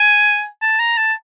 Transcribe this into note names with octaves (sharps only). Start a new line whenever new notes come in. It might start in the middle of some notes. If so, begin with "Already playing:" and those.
Already playing: G#5
A5
A#5
A5